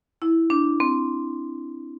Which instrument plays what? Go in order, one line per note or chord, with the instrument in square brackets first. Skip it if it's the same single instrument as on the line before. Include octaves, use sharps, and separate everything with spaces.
[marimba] E4
D4
C4